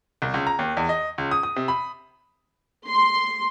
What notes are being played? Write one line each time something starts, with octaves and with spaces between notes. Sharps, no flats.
C2
C#2
A#5
D#2
E2
D#5
C#2
D#6
D#6
C3
B5
C6